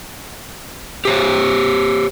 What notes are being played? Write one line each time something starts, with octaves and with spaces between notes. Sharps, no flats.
G4 C5 C#5